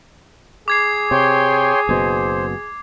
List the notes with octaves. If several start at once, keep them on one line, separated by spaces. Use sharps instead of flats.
G#4 D6 G#6 C7
C3 C#5 G5 C6
F#1 B2 C5